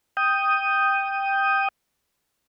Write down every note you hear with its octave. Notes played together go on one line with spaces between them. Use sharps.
G5 D#6